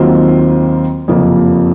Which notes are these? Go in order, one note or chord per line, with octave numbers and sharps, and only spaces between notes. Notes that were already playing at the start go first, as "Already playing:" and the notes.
Already playing: D#2 D#3 F#3 C4 F4
F#1 F2 C3 F3 A#3